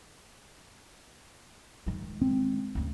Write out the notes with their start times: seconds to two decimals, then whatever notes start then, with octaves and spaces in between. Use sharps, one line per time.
1.86 D#3 G#3
2.22 C4
2.75 D2 C#3